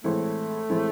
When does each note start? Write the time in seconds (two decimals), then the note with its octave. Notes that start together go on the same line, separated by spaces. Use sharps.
0.04 A2 E3 G#3 A3 C4 E4
0.70 A2 E3 G#3 C4 E4